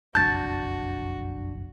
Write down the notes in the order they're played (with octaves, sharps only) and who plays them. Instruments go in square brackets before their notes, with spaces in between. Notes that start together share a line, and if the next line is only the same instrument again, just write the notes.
[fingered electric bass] F#1 B1 F2 [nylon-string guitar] D4 A5 [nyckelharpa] F#4 [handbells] G6 A6